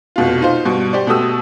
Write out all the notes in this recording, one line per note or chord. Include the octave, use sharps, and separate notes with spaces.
F1 B2 F4
D#4 F4 C5
G2 B2
G4 C5 D5
B2 A3 G4 D#6 E6